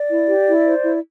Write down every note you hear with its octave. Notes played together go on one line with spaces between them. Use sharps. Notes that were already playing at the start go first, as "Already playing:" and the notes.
Already playing: D5
E4
G4
E4
C5
E4